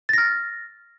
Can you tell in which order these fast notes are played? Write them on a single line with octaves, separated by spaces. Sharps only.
A6 A#6 F6